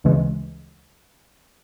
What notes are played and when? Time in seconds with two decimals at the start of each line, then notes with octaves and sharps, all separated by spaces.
0.04 D2 C#3 E3 G#3